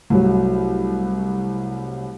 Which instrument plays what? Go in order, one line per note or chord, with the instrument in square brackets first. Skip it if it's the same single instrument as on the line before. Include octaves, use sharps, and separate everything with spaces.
[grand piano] C2 F#3 [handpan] A3